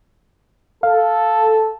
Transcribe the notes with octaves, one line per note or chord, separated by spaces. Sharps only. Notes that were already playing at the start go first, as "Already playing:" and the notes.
A4 F5